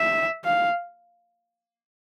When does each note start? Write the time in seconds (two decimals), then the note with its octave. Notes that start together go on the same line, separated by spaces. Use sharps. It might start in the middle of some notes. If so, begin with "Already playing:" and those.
Already playing: E5
0.45 F5